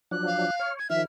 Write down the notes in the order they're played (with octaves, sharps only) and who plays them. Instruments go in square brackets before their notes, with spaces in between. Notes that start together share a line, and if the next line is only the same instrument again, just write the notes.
[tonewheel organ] F3 F#3 D4 [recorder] F#6
[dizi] F5
[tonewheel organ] C#5 [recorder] F6
[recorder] G#6
[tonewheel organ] D#3 F3 [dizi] E5 [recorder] F6